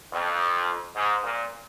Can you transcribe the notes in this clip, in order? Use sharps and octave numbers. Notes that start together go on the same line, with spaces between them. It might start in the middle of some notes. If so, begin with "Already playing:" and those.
F2
G#2
A#2